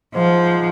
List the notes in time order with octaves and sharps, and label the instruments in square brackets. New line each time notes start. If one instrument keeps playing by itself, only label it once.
[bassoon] G#2 [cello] F3